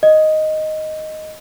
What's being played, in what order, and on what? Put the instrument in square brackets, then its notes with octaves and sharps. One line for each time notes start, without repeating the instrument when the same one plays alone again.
[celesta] D#5